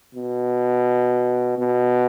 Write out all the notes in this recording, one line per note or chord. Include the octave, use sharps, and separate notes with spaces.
B2
B2